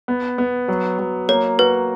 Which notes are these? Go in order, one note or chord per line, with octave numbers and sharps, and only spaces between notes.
B3
B3
F#3
F#3
A#3 C#5
F#4 B4